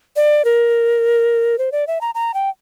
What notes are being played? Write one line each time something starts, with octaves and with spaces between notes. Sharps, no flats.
D5
A#4
C5
D5
E5
A#5
A#5
G5